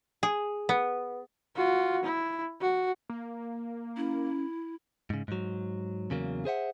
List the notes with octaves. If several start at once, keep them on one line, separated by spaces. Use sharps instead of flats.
G#4
B3
F4 F#4
E4
F#4
A#3
C#4 E4
G#2 C#3
G#2 F#3
E2 C#3 F#3 A#3
G#4 C5 E5 F#5